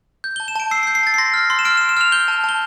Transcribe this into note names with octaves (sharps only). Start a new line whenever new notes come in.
G6
A5 G7
E7
A5 D7
E6 C7
C7
G6
C7
A5 A6
C7
C6 A#6
F6
C6
E7
F6 D7
E7
C6
E7
F6 F7
G6 G7
A5
A5 G7